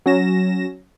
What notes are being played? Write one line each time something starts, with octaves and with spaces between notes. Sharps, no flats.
F#3 C#4 A#6 E7